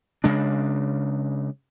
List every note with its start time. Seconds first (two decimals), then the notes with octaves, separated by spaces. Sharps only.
0.24 C#3 G#3 D4